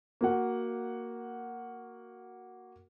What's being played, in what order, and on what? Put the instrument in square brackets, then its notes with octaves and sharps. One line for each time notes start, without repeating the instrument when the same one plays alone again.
[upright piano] A#3 F#4 F#5